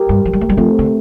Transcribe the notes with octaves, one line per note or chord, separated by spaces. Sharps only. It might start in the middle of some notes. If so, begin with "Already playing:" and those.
Already playing: G4 A#4
G2
F3
G3
A3
G3
F3 A3 C4
D3